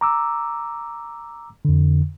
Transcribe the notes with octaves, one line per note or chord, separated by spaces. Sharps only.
A#5 D6 E6
F2 D3